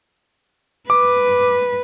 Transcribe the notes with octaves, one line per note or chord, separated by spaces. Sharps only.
B4 D6